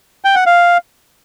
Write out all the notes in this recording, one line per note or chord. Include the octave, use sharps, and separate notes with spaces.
G5
F#5
F5